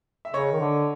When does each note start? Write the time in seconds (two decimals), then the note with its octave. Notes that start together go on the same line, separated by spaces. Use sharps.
0.25 E5
0.33 C#3 C#5 D#5
0.52 D#3
0.60 D3